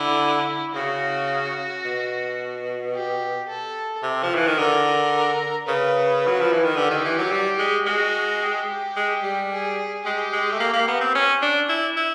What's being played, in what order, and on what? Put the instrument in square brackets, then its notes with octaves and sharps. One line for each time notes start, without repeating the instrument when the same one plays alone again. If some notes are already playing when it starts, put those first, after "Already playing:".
Already playing: [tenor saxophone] D3 [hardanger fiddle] E4
[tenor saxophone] C#3 [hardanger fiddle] F#4
[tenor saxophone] B2
[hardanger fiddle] G4
A4
[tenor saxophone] C3
F3
E3
D#3
[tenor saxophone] D3 [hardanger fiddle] A#4
[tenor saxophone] C#3 [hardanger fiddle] B4
[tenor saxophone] F#3
F3
E3
D#3
[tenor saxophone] D3 [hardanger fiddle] G4
[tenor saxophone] D#3
E3
F#3
G3
G#3
[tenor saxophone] G#3 [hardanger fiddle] F#4
[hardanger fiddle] G4
[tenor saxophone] G#3
G3
[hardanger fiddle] G#4
[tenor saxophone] G#3 [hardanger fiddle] G4
[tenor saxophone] G#3
A3
A#3
A#3
B3
C4
C#4
D4
E4
E4